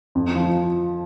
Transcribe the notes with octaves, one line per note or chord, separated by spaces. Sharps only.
F2
F3